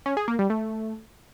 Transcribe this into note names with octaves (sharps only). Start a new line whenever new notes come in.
C#4
G#4
A#3
G3
A3